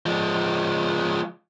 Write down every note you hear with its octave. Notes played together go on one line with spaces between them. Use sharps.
F3 G#3